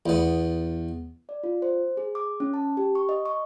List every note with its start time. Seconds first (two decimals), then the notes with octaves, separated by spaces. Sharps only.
0.06 E2 B3
1.29 D5
1.43 F4
1.62 C5
1.97 G#4
2.15 D6
2.40 C#4
2.54 A5
2.77 G4
2.95 C#6
3.09 D#5
3.26 C#6